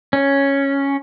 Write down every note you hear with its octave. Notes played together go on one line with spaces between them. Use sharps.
C#4